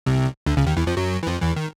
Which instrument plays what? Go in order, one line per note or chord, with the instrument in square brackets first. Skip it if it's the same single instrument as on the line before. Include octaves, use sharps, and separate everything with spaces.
[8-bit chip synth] C2 C3
D2 D3
C#2 C#3
D#2 D#3
E2 E3
F2 F3
F#2 F#3
E3
F2 F3
E2 E3
D#3